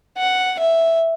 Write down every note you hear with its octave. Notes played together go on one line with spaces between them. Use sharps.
F#5
E5